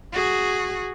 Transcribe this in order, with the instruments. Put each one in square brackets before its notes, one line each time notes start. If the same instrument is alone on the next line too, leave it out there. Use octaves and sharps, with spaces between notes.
[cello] F#4 G#4